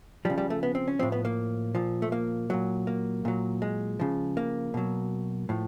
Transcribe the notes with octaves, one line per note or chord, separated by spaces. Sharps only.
C#3 F3 G3
G3
A3
B3
C4
C#4
A2 F3 C4
B3
A#3
A#2 F3
A3
A#3
A#2 F#3
A#3
A#2 F#3
G#3
C#3 F3
A#3
B2 F#3
A2 F3